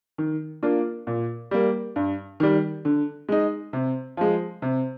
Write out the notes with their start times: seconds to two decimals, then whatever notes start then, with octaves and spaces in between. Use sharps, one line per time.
0.18 D#3
0.63 A#3 D4 F4
1.07 A#2
1.51 G3 A#3
1.96 G2
2.40 D#3 G3
2.85 D3
3.29 G#3 D#4
3.73 C3
4.17 F3 G#3
4.62 C3